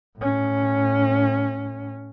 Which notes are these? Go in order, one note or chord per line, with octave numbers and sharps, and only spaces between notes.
A2 C#4